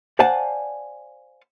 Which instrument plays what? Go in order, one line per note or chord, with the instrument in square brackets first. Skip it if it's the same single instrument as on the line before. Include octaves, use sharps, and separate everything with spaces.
[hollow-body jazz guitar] C5 D5 F5 F#5 G#5 A5